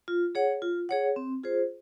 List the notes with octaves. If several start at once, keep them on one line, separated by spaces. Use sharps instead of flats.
F4
G#4 C#5 F#5
F4
G#4 C#5 F#5
C4
F4 G#4 C5